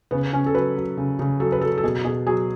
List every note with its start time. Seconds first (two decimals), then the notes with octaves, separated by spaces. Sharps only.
0.11 C#3 B3
0.33 C#3 C#4
0.46 A4
0.54 F#3 B4
0.76 F#3
0.97 C#3
1.19 C#3
1.40 F#3 A4
1.52 B4
1.61 F#3 A4
1.78 A4
1.83 B2 G#4
2.05 B2 G#4
2.27 F#3 G#4